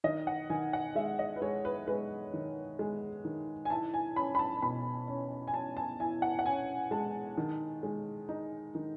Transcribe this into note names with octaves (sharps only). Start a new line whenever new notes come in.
D#3 D#5
F#5
D#3 G#5
F#5
G#3 E5
D#5
B4
G#3 C#5
B4
G#3 B4
D#3
G#3
D#3
G#5
E4 A5
G#5
C#4 B5
B5
A5
A5
B2 B5
C#4
G#5
C#4 A5
A5
E4 G#5
F#5
F#5
C#4 G#5
G#3 A5
D#3
G#3
D#4
D#3